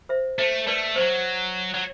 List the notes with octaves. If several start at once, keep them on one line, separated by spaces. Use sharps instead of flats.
C5 E5
A3 C5 E5
A3 B4 D5
F#3 C5 E5
F#3